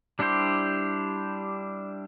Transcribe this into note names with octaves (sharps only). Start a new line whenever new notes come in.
G3 D4 E4 G4 C5